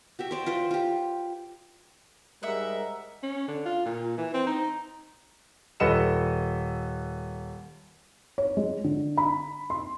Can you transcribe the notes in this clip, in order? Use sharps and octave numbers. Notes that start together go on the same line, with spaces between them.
F#4 G4 E5
C5 D5 A#5
F4 B4 C5
F4 G4
G#2 G3 G#3 A#4 E5 F#5
C#4
D3
F4
A#2
E3
C4
D#4
D#1 A4 B4 D#5 C#7 E7
C#5
G#3
D3
B5
C6